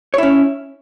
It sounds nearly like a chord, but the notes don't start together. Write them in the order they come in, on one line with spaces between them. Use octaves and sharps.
C#5 E4 C#4